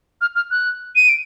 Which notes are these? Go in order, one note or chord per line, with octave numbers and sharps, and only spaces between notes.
F6
F6
F#6
D#7
D7